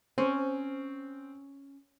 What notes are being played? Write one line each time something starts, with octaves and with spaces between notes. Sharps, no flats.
C4 C#4 C5